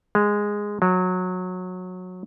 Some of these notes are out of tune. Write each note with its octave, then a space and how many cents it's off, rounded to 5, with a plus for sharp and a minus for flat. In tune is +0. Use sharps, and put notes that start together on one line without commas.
G#3 -10
F#3 -20